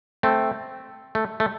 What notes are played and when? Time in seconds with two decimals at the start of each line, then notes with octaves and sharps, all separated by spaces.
0.23 A3 C4
1.15 A3
1.40 A3